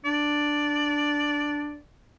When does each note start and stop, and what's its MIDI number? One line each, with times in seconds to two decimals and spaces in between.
0.05 1.77 62
0.05 1.80 74